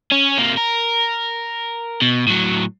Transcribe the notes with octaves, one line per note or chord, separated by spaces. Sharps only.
C#4
C3 A#3
A#4
B2
A2 F#3